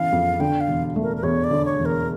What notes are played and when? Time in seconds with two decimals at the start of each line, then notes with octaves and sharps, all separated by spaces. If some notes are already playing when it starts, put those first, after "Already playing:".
Already playing: C#3 E3 F5
0.12 F2
0.40 D3 G5
0.61 F5
0.68 E1
0.96 A3
1.03 A#4
1.17 A#4
1.23 E2 C#5
1.44 D5
1.51 D3
1.65 C#5
1.79 E1
1.85 A#4